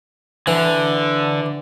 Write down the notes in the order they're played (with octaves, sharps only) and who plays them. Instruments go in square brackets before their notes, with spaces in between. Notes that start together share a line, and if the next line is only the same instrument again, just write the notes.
[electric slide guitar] D3 [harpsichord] E3